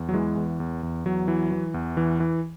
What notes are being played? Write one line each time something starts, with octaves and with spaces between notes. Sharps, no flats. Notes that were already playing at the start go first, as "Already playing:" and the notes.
Already playing: E2
F#3
E3 G#3
E2
E2
E2
E2 F#3
E3
E3
E2
E3
E3